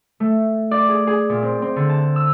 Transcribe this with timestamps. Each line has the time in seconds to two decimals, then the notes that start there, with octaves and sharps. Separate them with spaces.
0.20 A3
0.71 D5
0.89 G#4
1.07 G#4
1.30 A#2
1.43 C4
1.62 C4
1.76 D3
1.89 A5
2.16 E6